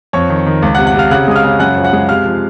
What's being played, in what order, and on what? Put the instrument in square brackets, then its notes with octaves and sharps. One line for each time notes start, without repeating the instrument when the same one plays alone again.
[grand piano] F2 C#5 C#6
D#3
D#3
C#2
F#5 F#6
C3
F#5 F#6
C3 F5 F6
C#3 F#5 F#6
G#3 D#6
F5 F6
C#3
F#2 F#5 F#6
F3
F#5 F#6
G#3
C3 F5 F6
F3